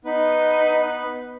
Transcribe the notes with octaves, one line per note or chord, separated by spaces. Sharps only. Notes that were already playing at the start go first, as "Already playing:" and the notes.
B3 D#4 B4